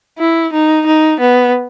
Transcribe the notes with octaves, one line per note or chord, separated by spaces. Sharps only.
E4
D#4
D#4
B3